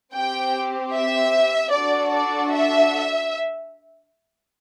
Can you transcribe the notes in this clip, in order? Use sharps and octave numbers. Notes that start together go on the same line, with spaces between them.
C4 G4 G5
E5
D4 F#4 A4 D5
D5
E5